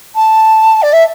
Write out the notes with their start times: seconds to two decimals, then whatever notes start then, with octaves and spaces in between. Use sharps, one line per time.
0.15 A5
0.82 D5
0.93 E5